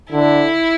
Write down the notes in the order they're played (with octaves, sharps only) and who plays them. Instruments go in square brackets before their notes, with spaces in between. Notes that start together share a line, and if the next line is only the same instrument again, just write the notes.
[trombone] D3 [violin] E4